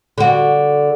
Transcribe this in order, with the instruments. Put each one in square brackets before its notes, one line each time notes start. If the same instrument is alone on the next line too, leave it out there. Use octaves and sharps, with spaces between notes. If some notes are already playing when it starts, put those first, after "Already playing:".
[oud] D3 F#4